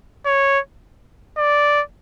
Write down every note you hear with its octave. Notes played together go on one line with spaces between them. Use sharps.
C#5
D5